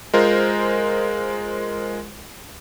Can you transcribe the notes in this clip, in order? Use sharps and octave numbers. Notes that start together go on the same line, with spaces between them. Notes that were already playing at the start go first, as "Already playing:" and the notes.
G#3 F4 A#4 C5